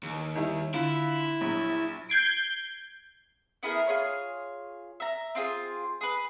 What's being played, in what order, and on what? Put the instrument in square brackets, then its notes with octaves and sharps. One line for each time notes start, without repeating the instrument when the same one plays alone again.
[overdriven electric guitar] D#2
[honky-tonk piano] D#3 G3 E4
[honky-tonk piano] D3 F4 [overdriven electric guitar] E4
[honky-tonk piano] A#1 F#3
[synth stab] G6 G#6 C7 D7
[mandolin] B3 E4 G#4 A#4
F4 G#4 C#5
E5 A#5
C4 F4 G#4
G#4 B4